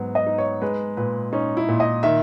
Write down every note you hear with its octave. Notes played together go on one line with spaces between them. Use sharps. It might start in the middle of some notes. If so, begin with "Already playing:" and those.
Already playing: G#2 F#3 B3
D#5
D#4
C#5
G#3 B4
A#2 B4
C#4 D#4
E4
A#2
D#5
D#3 E5